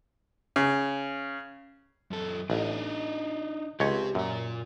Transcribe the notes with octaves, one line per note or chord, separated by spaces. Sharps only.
C#3
F#2 A4
A1 D4 D#4
C#2 G4 C#5 C6
F#2 A#2 A#4